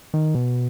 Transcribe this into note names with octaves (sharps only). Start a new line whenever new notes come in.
D#3
B2